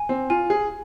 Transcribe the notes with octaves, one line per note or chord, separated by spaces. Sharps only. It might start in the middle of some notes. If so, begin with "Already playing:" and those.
Already playing: G#5
C4
F4 G#5
G#4